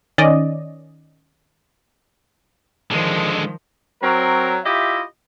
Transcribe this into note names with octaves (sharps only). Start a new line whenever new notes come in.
D#3 C#4 D5 D#5
D3 D#3 F3 G#3
F#3 C4 A#4
E4 F4 G4 D#5 E5